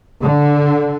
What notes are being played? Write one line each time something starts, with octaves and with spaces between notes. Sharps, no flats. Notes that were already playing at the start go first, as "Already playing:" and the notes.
D3